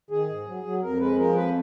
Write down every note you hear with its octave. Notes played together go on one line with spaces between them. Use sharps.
D#3 G#4
G#2
F#3
F#3
F2 A#4
G#3 B4
F3 A#4
F2 B4